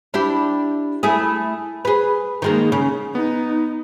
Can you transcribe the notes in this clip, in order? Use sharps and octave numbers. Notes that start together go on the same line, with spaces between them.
D4 E4 G4
A3 E4 G#4
G#4 B4
D#3 G#3 A#3
C#3
B3 D#4